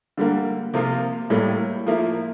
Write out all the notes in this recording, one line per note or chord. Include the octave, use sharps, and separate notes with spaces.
D3 G3 A#3
C3 F3 A#3 F4
A2 G3 A#3
F3 A#3 E4